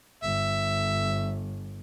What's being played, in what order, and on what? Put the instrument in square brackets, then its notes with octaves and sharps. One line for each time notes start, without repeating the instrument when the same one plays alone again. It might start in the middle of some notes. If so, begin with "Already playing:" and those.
[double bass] G1 [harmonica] E5